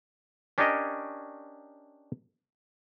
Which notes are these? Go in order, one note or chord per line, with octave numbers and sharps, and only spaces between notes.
C#4 D4 G4 A#4 C#5 D#5